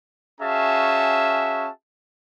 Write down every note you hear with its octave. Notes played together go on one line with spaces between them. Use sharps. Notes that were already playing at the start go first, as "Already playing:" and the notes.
C#4 F#4 G#4 E5 F5 A5